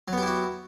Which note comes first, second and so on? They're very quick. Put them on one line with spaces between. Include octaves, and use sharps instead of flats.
F#3 B3 G4 E4 F#4